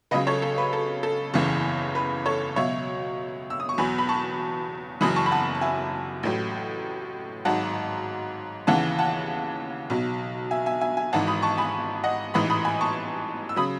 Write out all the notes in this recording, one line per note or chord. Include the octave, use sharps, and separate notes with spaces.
C#2 C#3 F#3 B4 D#5
A4 C#5
A4
B4
A4
A4
F#1 E2 C#3 E3
B4
A4 C#5
C#2 B2 F#3 C#5 E5
E6
D#6
C#6
E2 B2 F#3 G#5 B5
B5
A5 C#6
F#1 F#2 E3 B5 D#6
A5 C#6
B5
F#5 A5
A5
E5 G#5
A1 A2 F#3
G#1 G#2 F#3 F#5 A5
D#2 C#3 E3 F#5 A5
F#5 A5
B1 B2 F#3
E5 G#5
E5 G#5
E5 G#5
E5 G#5
G#1 G#2 E3 F#5 A5
B5 D#6
A5 C#6
G#5 B5
D#5 F#5
A1 G#2 E3 B5 D#6
B5 D#6
G#5 B5
A5 C#6
E6
C#3 F#3 B5 D#6